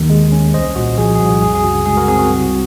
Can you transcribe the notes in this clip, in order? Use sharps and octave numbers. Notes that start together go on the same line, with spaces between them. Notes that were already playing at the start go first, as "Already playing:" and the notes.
Already playing: D#2 D#3
G#3
C#4
C2 C5 D#5
A#2 F#4
F3 G#4
G#4
C2 F#4
F#2 G#4
G#4
C#3 F#4
G#3 G#4
F#4 A#4
C4 G#4
F#4
C2